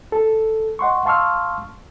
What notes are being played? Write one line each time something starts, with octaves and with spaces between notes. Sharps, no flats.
A4
D#5 F#5 C6 C#6
F5 A5 C6 C#6 E6 F6